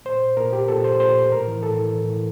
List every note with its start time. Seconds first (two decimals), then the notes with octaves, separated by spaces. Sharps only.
0.05 A#2 C5
0.37 A#2 A#4
0.53 G4
0.68 A#2 A4
0.84 C5
1.00 A#2 C5
1.31 A2 A#4
1.47 E3
1.63 A2 A4
1.79 E3
1.94 A2
2.10 E3